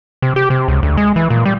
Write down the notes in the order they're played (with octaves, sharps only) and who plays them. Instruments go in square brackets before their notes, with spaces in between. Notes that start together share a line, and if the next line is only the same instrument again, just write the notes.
[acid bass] C3
G4
C3
C#2
D2
G#3
E3
A#2
G3